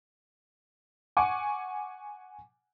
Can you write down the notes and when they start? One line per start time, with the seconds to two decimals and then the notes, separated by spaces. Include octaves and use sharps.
1.17 F#5 G#5 C#6 D6